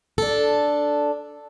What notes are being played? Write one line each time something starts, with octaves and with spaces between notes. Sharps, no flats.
D4 A4